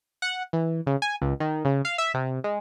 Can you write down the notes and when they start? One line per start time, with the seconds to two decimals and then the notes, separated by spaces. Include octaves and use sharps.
0.22 F#5
0.53 E3
0.87 C#3
1.02 G#5
1.22 C#2
1.40 D#3
1.65 C#3
1.85 F5
1.98 E5
2.14 C3
2.44 G#3